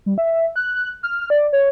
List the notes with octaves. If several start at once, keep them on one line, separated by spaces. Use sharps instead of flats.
G3
E5
F#6
F6
D5
C#5